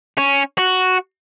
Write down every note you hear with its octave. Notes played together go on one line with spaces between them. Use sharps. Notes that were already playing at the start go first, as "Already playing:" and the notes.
C#4
F#4